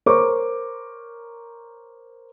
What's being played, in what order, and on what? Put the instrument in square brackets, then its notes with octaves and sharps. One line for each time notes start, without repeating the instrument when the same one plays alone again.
[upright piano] A#4 C5 C#5 C#6 D6